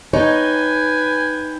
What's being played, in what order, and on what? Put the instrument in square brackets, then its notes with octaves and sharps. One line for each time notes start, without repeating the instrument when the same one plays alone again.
[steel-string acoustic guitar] D#4 [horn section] B4 G5 G#5 [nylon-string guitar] C#5